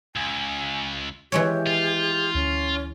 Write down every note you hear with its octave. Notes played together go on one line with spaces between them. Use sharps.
C#2 G#5
E3 G#3 G4 C#5
F4
D2 C#4